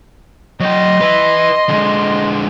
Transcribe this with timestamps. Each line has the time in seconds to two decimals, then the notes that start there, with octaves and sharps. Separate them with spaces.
0.60 F#3 D#5 G5 C6
1.01 B4 E5
1.69 D3 G#3